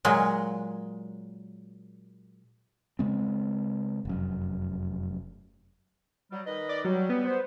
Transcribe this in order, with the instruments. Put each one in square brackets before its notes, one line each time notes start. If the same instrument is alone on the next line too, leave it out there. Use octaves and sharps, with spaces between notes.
[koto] A#2 F#3 G#3
[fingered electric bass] C#3 G#3 C4
F1 F#2
[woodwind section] F#3 G3
D#3 B4 D#5
[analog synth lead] D5
[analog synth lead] F#3 [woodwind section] G3
[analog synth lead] B3
[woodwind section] C5